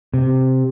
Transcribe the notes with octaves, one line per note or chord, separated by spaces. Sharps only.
C3